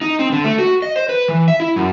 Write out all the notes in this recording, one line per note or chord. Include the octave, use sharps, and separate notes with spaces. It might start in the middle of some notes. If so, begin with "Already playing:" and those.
D#4
C4
D3
A3
F#4
D#5
C5
B4
E3
E5
E4
F#2